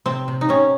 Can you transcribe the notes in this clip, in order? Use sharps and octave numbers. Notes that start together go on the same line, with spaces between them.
C3 C4
C3
D#4
C3 C#4